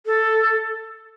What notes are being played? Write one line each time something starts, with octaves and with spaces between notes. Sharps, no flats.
A4